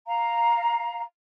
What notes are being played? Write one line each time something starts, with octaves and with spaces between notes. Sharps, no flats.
F5 A#5